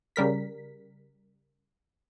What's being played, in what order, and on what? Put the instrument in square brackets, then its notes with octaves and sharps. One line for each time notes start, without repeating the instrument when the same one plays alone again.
[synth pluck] C#3 G3 A#4 B6